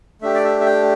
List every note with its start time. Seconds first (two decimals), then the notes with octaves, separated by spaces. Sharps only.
0.22 A3 D4 G4 E5
0.34 D5
0.44 E5
0.61 E5
0.66 G5